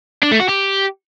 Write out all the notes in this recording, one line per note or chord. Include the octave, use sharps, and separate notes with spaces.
D4
A3
F#4
G4